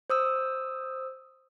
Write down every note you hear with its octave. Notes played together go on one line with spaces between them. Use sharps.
C5 D#6 E6